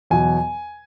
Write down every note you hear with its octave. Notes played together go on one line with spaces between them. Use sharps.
E2 B2 F#3 G#5